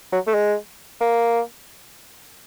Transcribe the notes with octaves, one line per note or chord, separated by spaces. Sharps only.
F#3
A3
G#3
A#3